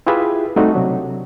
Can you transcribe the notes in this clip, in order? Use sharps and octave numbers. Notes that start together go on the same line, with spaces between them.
E4 F4 G4 G#4 B4 E5
G3 A3 C4 D#4 F#4
C3 F#3 D4